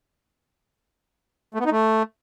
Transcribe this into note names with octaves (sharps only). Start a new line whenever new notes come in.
A3
B3
D#4
A3